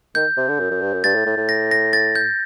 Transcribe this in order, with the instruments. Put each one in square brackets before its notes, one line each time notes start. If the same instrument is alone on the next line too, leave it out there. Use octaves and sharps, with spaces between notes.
[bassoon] D#3 [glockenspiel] G6
[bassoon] C3
D3
F#2
F#2
G2
F#2
[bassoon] G2 [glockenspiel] A6
[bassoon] A2
A2
A2
[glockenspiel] A#6
A#6
A6
G6